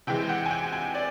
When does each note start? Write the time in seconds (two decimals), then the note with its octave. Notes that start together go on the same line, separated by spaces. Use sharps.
0.07 C3 E3 G#3 G5
0.29 F#5
0.46 G#5
0.51 G5
0.73 G#5
0.94 D5